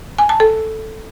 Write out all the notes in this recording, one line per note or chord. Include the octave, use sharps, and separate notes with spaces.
G#5
A5
A4